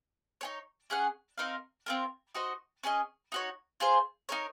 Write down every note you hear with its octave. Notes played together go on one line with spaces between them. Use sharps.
D#4 G#4 C#5
C#4 G#4 D#5 F#5
C4 D#4 A#4 F5
C4 F4 A#4
D#4 F#4 C5 D#5
C#4 G#4 C5 D#5
D#4 F#4 C#5
F4 G#4 C5
D#4 A#4 C#5